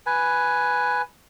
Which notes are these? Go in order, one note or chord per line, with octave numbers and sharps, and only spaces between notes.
B4 G#5